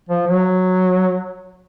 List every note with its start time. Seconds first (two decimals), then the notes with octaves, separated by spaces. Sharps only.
0.09 F3
0.27 F#3